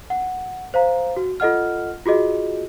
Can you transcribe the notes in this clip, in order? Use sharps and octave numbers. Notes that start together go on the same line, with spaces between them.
F#5
C5 F5 A#5
F#4
F4 A4 D#5 F#5 F6
F4 F#4 G#4 D#5